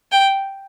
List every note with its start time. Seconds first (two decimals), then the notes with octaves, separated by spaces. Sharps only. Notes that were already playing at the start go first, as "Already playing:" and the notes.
0.12 G5